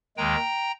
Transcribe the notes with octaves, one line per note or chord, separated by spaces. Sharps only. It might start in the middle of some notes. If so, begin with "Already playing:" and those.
D#2 D#3 G#3 G5 A#5